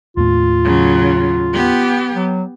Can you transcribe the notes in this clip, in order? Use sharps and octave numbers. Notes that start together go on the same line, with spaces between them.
D#2 A2 A3 F4
C#3 F#3
B3 G4
F#3